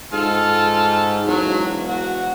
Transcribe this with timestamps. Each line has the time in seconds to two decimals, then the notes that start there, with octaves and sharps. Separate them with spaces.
0.13 G#2 F4 A4
1.27 E1 F#3
1.88 F#4